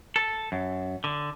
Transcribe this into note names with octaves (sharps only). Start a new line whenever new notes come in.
A4
F#2
D3